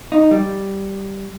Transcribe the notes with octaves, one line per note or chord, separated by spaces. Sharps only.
D#4
G3